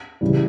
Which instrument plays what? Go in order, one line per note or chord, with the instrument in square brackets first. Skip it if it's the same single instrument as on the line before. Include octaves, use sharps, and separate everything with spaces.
[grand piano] C#3 E3 G3